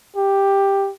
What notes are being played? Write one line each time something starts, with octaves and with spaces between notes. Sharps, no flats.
G4